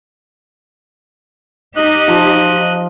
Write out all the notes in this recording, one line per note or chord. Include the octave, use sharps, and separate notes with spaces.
D#4 G4 D#5 F#6
F3